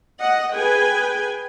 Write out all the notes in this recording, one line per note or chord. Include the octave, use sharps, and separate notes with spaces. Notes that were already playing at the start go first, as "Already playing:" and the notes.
D#5 F#5
G#4 B4 G5 G#5